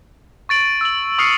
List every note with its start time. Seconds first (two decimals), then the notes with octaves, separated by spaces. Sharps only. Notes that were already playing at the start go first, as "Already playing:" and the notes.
0.49 C#6 A6 D7 F#7
0.81 E6 F#7
1.18 C#6 D#6 F6 C7 C#7